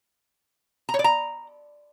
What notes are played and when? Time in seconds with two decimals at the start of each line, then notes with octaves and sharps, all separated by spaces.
0.89 A#5
0.94 C#5
0.99 D5
1.04 A#5